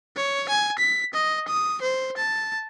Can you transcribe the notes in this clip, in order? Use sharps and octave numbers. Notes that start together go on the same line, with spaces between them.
C#5
G#5
B6
D#5
D#6
C5
A5